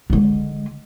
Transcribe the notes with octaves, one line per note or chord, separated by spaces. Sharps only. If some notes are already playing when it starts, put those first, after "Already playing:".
D3 G#3